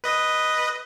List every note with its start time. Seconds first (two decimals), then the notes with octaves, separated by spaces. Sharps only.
0.04 B4 D#5